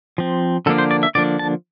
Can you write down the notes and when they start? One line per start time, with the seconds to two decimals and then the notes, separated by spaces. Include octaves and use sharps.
0.18 F3 C4
0.66 D3 F3 A#3 D4 A4
0.78 C5
0.91 D5
1.03 E5
1.15 D3 F3 A#3 D4 D5
1.39 A5